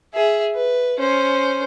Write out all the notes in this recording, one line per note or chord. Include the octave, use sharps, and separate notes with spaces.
G#4 E5
B4
C#4 C5